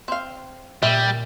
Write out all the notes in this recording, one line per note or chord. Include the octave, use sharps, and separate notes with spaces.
C4 F5
A#2 G3 E5